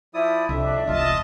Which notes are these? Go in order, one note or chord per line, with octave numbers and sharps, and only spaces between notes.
F3 E4 D5 D#6
C2 F2 D4 E5
E1 C2 F4 D#5 A5